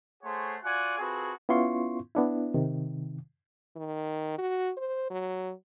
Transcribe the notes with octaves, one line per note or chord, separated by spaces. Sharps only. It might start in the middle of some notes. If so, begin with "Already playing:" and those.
A3 G#4 C5 C#5 F#5 C6
F4 F#4 D5 F#5 G#5
C4 F4 F#4 G#4 A4 B4
B3 C#4 E4 F4 C6 C#6
B3 D4 E4
C3 D#3
D#3
F#4
C5
F#3